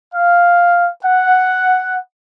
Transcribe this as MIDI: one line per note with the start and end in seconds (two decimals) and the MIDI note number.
0.14 0.90 77
1.05 1.98 78